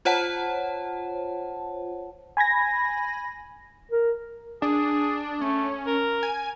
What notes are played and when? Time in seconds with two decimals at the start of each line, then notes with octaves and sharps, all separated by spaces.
0.05 F4 C5 C#5 F#5 A5
2.37 G#5 B5 G#6 A#6
3.92 A#4
4.62 D4 G#4
5.41 A3 C#4
5.87 A#4
6.23 G#5